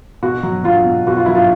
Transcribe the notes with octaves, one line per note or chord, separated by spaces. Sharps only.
B2 F#4
F#3
F#3 F4
B2
B2 F#4
F4
F#3 E4
F4